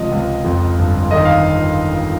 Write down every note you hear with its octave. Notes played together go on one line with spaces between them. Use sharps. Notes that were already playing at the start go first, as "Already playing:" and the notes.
Already playing: C#2 C3 F3 D#5
C#2
F2
G1
D#3 D#5
F5